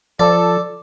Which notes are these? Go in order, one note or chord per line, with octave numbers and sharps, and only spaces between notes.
F3 A4 D5